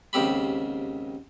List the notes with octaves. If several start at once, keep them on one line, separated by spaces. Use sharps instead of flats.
D#2 G#2 C#3 C4 G4 B5